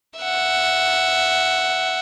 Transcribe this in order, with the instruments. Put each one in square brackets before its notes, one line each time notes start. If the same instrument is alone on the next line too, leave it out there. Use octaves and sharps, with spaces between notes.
[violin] E5 F#5